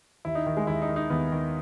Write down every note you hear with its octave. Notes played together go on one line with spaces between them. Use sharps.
D#2 E4
D#4
D#3
G#3
D#2 E4
D#4
D#3
D#4
D#2 B3
D#3